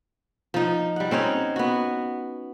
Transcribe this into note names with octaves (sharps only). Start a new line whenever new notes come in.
F3 D#4
G3 F#5
C4 C#4 D#4 C#5
B3 F#4